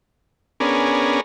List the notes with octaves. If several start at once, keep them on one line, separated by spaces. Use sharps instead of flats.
B3 C#4 D4 G#4 A#4